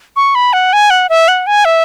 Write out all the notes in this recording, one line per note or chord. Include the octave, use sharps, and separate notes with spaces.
C#6
B5
F#5
G#5
F#5
E5
F#5
G#5
E5